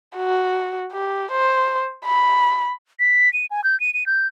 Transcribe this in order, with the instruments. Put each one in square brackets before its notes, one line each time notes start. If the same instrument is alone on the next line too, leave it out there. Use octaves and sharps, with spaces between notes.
[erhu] F#4
G4
C5
B5
[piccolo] B6
D#7
G#5
G6
D#7
D#7
G6